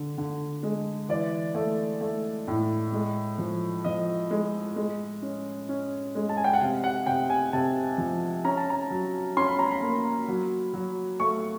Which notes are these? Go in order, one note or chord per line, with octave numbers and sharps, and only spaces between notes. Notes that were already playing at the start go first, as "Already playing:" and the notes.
Already playing: D3
D3
G#3
E3 D5
A3
A3
A2
G#3
F3
F3 D#5
G#3
G#3
C#4
C#4
G#3
A5
G#5
G5
F#5
C3 F5
F#5
C3 G5
G#5
C3 A5
F3
C#4 A#5
A5
A#5
F#3
C#4 C6
B5
A#5
B5
A#3
F#3
F#3
A3 C#6